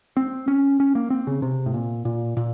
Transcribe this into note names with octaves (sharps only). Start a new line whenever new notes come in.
C4
C#4
C#4
A#3
C4
C#3
C3
A2
A#2
A#2
A#2